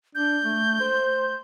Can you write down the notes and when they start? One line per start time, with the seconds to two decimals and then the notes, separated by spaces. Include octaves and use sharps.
0.15 D4 G6
0.43 A3
0.80 C5